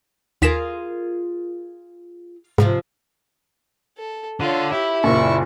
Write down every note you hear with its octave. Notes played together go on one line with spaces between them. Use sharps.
D#2 F4 G#4 A#4 B6 E7
G#2 C3 F3 F4
A4
D3 F4 C#5
E4 G4
F#1 A#2 C#6